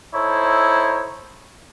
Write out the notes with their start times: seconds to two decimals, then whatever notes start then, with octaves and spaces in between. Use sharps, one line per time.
0.15 D#4 E4 A4 C5 C#5